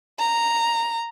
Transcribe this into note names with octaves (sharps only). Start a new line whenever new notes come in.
A#5